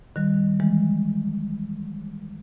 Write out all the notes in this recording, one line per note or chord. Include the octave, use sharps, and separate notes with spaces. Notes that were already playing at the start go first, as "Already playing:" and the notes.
D#3 G3
E3 G#3